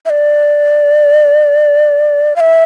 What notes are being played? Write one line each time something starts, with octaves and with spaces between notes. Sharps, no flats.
E5
D5
F5
E5